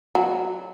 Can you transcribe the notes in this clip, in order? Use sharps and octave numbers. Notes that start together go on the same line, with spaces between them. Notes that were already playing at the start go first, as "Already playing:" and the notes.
F#3